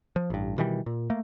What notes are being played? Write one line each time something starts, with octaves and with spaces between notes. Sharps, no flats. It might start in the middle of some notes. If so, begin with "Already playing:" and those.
F3
A1 G2
B2 D#3 E3 G3
A#2
A3 A#3